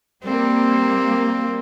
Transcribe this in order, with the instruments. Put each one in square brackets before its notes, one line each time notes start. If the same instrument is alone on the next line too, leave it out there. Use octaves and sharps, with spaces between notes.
[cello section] G3 A#3 [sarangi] C4